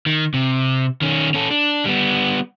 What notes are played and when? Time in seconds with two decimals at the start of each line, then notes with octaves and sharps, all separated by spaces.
0.06 D#3
0.34 C3
1.02 D#3 C#4
1.34 C#4 A4
1.51 D4
1.85 G3 B3